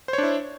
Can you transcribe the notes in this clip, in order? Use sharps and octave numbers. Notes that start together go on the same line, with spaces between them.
D4 E4 C5 C#5